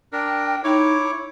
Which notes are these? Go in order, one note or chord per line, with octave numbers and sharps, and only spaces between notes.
D4 A#4 G5
D#4 E4 C#5 D6